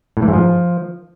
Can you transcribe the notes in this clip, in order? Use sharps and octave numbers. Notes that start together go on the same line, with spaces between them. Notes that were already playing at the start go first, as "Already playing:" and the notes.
A2
E3
G#2
F3